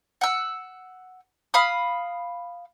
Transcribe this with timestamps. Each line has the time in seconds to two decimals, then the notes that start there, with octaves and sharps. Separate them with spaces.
0.21 F#5 E6
1.54 F5 B5 D#6